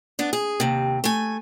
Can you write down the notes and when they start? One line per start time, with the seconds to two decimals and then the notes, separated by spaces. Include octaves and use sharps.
0.19 B3 D4
0.33 G#4
0.60 D#2 C3
1.04 A3 G#5